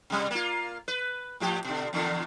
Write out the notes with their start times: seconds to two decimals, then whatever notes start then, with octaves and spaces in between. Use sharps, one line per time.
0.10 C3 G3
0.31 A#3 F4
0.88 B4
1.40 A2 F3 G4
1.65 B2 D3
1.93 E2 A#2 D3